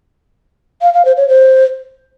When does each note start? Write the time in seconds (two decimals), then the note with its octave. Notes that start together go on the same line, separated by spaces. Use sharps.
0.82 F5
0.93 F5
1.05 C5
1.17 C#5
1.28 C5